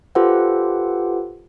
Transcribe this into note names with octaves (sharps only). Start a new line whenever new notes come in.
F4 G4 A4 B4 C5 F#5